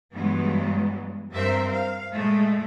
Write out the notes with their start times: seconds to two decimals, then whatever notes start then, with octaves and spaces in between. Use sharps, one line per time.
0.14 G2 E3 F#3 G#3 B3
1.32 G2 C4 A#4 C5 E5
1.72 F5
2.13 A#2 G#3 A3